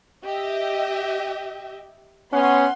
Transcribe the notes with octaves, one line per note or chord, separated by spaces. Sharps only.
G4 D#5 E5
B3 C#4 F#5 C6